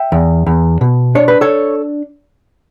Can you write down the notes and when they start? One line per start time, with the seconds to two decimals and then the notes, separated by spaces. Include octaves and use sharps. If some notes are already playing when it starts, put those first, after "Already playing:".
Already playing: E5 G5
0.12 E2
0.46 E2
0.81 B2
1.15 D4 C#5
1.28 B4
1.41 A4 C#5